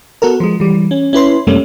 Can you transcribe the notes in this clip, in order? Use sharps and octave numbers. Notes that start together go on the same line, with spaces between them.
B3 F#4 A4 A#4
F3 G#3
E3 G3
C#4
C#4 E4 B4 C6
F#2 C3 G3 A3 A#3 C#4